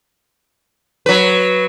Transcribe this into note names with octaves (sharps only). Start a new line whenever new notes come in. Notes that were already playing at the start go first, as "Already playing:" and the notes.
F#3 B4